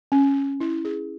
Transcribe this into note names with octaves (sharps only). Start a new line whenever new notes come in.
C#4
E4
G#4